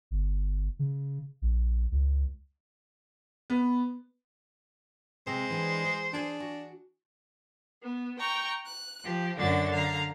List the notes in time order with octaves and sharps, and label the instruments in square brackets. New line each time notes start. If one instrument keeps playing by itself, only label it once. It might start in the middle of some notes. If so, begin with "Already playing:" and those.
[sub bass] G1
C#3
A#1
C#2
[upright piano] B3
[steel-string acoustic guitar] C3 [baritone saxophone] G#3 [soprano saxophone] C5
[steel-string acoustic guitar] E3 D4 G#4
G#4
[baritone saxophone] D4 [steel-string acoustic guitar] G#4 G#5
[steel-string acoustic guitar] F#4
[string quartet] B3
G5 A#5 C#6
F#6
F3 G4
F#2 D3 D4 F#4 A6
D3 F5 A#5